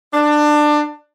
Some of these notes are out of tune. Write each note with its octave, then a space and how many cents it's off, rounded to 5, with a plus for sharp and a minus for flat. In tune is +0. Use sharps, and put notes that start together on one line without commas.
D4 +20